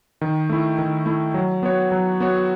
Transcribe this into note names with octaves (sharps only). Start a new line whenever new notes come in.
D#3
A3 E4
D#3
A3 E4
F#3
B3 F#4 C#5
F#3
B3 F#4 C#5